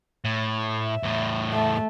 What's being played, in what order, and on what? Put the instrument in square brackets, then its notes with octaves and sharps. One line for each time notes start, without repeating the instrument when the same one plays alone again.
[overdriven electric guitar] A2
[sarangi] E5
[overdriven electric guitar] E2 A2
[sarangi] A3